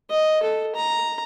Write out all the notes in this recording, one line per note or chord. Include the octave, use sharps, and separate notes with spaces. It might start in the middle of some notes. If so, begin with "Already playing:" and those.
D#5
A4
A#5